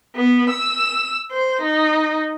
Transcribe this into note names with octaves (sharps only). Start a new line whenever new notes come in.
B3
E6
C5
D#4